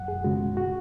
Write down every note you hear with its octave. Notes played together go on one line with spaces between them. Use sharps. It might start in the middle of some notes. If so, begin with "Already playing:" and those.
Already playing: F#2 F#5
G#4
C#3 G#3 F#4
F#4